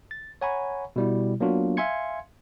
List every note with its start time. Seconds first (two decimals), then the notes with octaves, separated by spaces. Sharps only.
0.11 A6
0.41 C#5 F#5 G#5 A#5 B5 C#6
0.96 B2 G3 E4
1.40 F#3 A#3 B3 D4 F4 F#4
1.77 E5 F5 G#5 C6 G#6 C#7